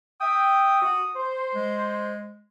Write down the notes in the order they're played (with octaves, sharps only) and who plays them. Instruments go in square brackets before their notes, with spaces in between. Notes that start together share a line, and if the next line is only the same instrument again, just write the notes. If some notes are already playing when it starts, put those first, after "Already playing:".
[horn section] E5 G5 [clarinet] D#6
[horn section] F#4
C5
[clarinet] G#3